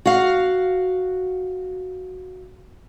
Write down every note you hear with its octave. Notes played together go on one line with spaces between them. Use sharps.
F#4 F5